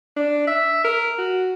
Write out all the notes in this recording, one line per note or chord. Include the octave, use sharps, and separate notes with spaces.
D4
E5
A#4
F#4